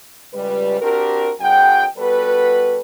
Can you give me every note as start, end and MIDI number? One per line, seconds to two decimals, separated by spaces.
0.34 0.81 37
0.34 0.81 55
0.34 0.81 71
0.81 1.32 60
0.81 1.32 62
0.81 1.32 66
0.81 1.32 67
0.81 1.32 70
1.40 1.85 35
1.40 1.85 42
1.40 1.85 68
1.40 1.85 78
1.40 1.85 79
1.98 2.79 55
1.98 2.79 59
1.98 2.79 66
1.98 2.79 69
1.98 2.79 71